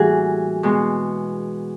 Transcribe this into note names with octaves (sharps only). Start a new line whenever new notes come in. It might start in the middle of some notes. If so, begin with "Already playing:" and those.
Already playing: A2 E3 G3 A#3 F#4 G#4
B2 G#3